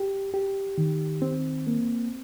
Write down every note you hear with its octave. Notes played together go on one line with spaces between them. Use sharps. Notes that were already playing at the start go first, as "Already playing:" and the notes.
Already playing: G4
G4
D#3
C4
A#3